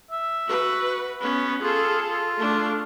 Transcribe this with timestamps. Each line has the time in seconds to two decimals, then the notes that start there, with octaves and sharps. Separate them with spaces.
0.11 E5
0.47 F#4 B4
1.21 B3 C#4 B4
1.62 F4 G#4 A4
2.07 F4
2.37 A3 D4